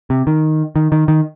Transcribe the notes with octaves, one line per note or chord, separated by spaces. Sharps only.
C3
D#3
D#3
D#3
D#3